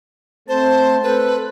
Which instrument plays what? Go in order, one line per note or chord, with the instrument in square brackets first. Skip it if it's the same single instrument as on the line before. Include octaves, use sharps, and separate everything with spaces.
[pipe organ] A3 C4 A5 [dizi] C5
[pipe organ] A4 [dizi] B4